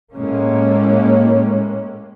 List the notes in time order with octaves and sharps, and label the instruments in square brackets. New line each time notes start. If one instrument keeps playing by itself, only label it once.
[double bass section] A2 G#3 A#3 C#4